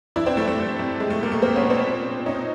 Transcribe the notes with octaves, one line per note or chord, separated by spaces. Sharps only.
E3 D4 E4
C4 D4
C3 A3
A3
C3
C3
B2 G#3
A3
B2 A#3
A3
B2 A#3 C4
B3 C#4
B2
C4 D4
A#2
A#2
A#2 C#4 D#4